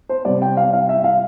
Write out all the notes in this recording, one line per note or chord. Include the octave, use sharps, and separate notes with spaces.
C5
C3 G3 D5
G5
F5
F5
E5
F5